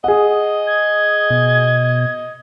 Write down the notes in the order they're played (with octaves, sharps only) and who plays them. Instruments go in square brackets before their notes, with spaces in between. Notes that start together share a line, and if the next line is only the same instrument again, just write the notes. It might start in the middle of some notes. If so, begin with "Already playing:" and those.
[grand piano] G#4 F#5 [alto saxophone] D#5
[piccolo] G#6
[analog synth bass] B2